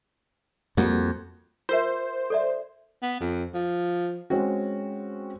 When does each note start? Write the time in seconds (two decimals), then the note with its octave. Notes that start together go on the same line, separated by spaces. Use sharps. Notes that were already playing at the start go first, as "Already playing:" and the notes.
0.77 F2 G3 A#3 F#4
1.69 F4 A#4 C5 E5
2.30 A4 D5 E5
3.02 B3
3.20 F2
3.54 F3
4.30 G#3 C4 C#4 F#4